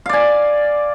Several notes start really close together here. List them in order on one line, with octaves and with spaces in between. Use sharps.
F5 D5 G#5